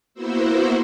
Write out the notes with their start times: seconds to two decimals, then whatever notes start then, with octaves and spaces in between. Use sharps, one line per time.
0.14 A#3 B3 E4 F#4 C5 E5